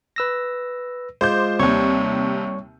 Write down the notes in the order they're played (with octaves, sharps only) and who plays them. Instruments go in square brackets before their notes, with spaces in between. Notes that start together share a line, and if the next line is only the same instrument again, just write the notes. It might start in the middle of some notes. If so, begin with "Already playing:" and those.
[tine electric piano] B4 E6 A#6
[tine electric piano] G#3 F4 [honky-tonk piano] C5 D6 G6
[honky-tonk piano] D#2 C3 [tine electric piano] G3 C#5 C#6